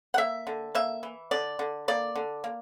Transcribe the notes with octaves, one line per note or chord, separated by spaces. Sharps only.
F#5
A#3 E5
D3
A#3 E5
E3
D3 D5
D3
A#3 D5
D3
A#3